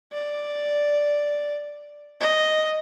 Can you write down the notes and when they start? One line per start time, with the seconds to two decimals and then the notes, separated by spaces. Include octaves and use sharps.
0.13 D5
2.21 D#5